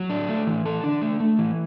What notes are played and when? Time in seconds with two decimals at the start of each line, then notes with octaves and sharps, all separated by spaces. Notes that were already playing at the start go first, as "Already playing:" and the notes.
Already playing: F#3
0.10 D4
0.29 A3
0.47 E3
0.66 A4
0.84 D4
1.02 A3
1.20 A3
1.39 E3